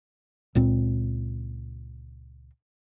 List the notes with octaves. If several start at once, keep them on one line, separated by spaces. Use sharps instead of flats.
C#2 A#2 C4